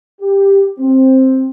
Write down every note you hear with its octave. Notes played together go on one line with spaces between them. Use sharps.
G4
C4